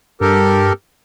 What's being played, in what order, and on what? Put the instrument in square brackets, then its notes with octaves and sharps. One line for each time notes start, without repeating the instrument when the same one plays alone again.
[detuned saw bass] G2 [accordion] G4 A4 A#4